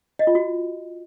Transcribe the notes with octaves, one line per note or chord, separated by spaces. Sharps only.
D#5
F4
F#4